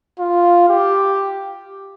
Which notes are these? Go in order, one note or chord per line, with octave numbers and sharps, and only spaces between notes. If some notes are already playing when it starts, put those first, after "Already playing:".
F4
G4